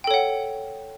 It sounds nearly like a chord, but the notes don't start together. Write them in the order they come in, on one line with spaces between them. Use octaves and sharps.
G5 A4 C#5 F#5